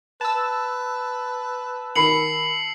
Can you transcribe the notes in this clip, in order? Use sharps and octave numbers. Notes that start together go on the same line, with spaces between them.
B4 A5 E6
D#3 B5 C7 C#7 F#7